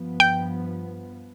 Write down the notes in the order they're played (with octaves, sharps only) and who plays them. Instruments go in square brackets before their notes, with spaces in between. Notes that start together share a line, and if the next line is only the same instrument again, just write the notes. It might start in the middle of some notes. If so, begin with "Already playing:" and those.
Already playing: [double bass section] G2 F3 B3
[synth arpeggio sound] G5